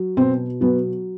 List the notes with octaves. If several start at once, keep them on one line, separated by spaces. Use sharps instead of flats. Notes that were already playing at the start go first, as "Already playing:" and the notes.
Already playing: F#3
B2 C4
F#3 B3